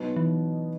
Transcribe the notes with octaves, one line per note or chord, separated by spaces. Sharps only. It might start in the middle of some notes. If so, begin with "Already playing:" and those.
Already playing: B2 F#3 B3 D#4
E3